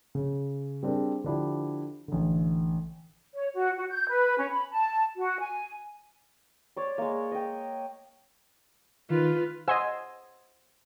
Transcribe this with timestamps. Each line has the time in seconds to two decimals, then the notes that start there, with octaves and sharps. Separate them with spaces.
0.15 C#3
0.83 G3 C4 D4 G#4 A#4
1.24 D3 F3 D4 E4 G4
2.08 A1 D3
3.35 C#5
3.54 F#4
3.77 F#4
3.89 G6
4.08 B4
4.37 C#4
4.51 B5
4.71 A5
5.17 F#4
5.39 G#5
6.76 C#5 D5 C6
6.98 G#3 A#3
7.32 D#5 G5
9.10 D#3 F4 B4
9.68 C5 D#5 F#5 G#5 C6 E6